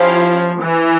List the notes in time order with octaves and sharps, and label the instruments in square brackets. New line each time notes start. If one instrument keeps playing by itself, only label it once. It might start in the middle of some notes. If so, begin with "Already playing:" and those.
Already playing: [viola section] F3 [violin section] C#4 E4 G4 C5 F5
[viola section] E3